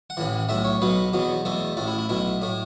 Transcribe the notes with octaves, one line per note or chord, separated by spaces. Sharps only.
F#5
A1 A2 E3
B1 A2 A3 E5
C#5
B1 B2 F#3 B3 B4
E2 B2 F#3 B3
E2 B2 A3 A4
A1 A2 A3 A4
E4
E4
B1 B2 A3 E4
A2 A3